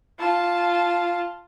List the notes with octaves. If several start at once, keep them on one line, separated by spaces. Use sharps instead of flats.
F4 A5